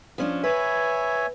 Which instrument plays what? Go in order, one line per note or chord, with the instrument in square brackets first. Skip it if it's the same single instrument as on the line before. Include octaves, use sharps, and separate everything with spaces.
[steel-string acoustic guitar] F3 C#4 D4
[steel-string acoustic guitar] B4 [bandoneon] C#5 E5 G#5